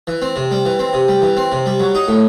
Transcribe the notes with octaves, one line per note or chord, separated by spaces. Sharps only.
E3
C4
C3
G3
E3
C4
C3
G3
E3
C4
C3
G3
F#3
D#4
A2